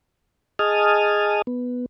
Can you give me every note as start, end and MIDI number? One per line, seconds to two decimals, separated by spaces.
0.59 1.42 68
0.59 1.42 75
0.59 1.42 80
0.59 1.42 81
0.59 1.42 87
0.59 1.42 89
1.47 1.86 59